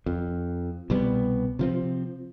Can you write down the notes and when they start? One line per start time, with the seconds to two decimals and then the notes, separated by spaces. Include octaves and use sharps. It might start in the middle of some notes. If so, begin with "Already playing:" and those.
0.06 F2
0.90 C2 B2 G3 B3
1.59 C3 F3 C4